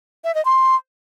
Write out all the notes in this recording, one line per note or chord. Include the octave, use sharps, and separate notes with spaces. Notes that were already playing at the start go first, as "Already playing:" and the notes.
E5
D#5
C6